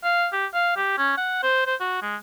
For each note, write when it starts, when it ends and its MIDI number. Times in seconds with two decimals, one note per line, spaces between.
0.04 0.28 77
0.33 0.46 67
0.54 0.73 77
0.76 0.97 67
0.98 1.15 61
1.18 1.38 78
1.43 1.66 72
1.66 1.75 72
1.80 1.98 66
2.02 2.16 56